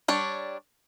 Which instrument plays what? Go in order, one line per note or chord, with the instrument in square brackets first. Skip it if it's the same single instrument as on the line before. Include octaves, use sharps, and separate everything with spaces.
[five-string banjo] G3 D4 C#5